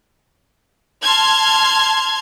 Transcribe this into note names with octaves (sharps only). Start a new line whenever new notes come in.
A5 C6 F6 G#6